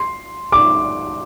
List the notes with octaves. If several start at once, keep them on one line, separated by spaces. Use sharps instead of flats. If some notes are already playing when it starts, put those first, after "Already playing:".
Already playing: C6
D6